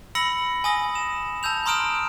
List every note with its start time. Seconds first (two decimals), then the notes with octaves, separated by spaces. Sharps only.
0.15 B5 E6 A#6 C#7 F#7
0.64 G#5 D#6 A#6
0.95 E7
1.43 A5 E6 G6 F7
1.66 A#5 C6 D#6 F6 D7 E7